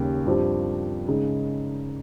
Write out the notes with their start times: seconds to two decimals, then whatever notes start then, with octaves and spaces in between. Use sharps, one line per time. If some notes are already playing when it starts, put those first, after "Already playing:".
Already playing: D#2 C#3 G3
0.25 G2 F3 C4 G4
1.08 C#3 G#3 D#4 G#4